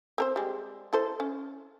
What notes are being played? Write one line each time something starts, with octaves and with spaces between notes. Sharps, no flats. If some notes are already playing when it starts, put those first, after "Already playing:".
C4 A#4 C5
G3 G#3
E4 A4 C5
C#4